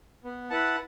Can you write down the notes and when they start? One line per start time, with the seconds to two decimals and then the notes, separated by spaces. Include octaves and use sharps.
0.24 B3
0.50 E4 B4 F#5 A5